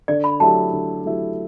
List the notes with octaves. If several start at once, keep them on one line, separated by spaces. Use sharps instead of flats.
D3 D5
B5
F#3 A3 E4 G4 A5
D3
F#3 A3 E4 G4